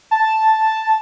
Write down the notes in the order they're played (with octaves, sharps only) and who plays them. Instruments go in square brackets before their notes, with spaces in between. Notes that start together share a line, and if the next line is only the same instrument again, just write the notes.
[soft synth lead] A5